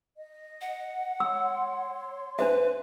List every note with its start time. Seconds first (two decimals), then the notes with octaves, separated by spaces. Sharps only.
0.17 D#5
0.61 F#5
1.20 C#5 C6 E6
2.39 D4 B4 C5 E5